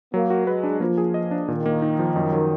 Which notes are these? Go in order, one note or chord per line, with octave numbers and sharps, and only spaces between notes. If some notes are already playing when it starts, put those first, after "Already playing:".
F#3 A#3
F#4
G#3 B4
D4
F3 A#3
G#4
D#5
D4
A#2 D#3
A#3
D#4
F3
F#2
F#3